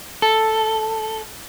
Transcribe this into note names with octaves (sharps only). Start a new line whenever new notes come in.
A4